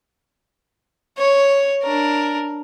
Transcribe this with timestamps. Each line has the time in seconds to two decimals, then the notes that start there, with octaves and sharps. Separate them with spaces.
1.18 C#5
1.83 D4 A#4